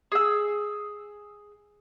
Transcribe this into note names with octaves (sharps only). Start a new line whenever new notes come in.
G#4 E6